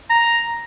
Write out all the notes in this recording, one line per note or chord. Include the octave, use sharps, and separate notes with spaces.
A#5